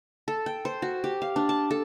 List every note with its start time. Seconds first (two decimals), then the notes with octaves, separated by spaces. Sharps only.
0.28 A4
0.46 G5
0.65 C5
0.82 F#4
1.04 G4
1.22 F5
1.36 D4
1.49 A5
1.71 A4